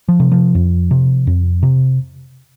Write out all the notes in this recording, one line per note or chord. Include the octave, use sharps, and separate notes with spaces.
F3
C3
F3
F2
C3
F2
C3